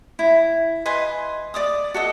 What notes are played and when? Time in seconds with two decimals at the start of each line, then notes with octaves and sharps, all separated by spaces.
0.19 E4
0.86 B4 D#5 G#5 C6
1.54 D5 D6 D#6
1.94 F#4 A4 D#5